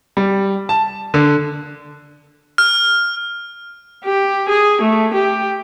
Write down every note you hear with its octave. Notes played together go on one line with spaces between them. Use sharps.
G3
A5
D3
F6
G4
G#4
A3
G4